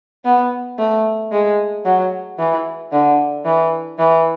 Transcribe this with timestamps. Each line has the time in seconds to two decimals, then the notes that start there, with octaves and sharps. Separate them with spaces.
0.25 B3
0.79 A3
1.32 G#3
1.85 F#3
2.39 E3
2.92 D3
3.45 E3
3.99 E3